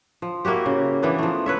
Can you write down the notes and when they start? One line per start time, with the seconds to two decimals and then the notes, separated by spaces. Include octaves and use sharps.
0.22 F3
0.45 A#3 E4 F#4 G4
0.66 C#3
1.02 E3 A#3 B3 D4
1.18 F3 A3
1.46 B4 C#5 E5